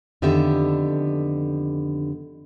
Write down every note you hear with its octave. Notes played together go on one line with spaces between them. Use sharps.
F2 D3 D#3 B3 G4 E5